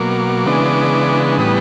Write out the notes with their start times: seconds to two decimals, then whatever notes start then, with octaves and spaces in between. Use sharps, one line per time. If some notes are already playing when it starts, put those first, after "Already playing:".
Already playing: B2 F#3 A#3 D6
0.46 C#3 E3 G#3 B3 D4
1.38 A2 E3 G3 B3 D#6